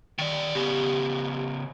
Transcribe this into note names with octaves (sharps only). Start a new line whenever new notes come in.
D#3 D5
C#3 B3 G4